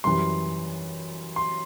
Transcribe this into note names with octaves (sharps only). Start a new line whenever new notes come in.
F#2 E3 G3 C6
C6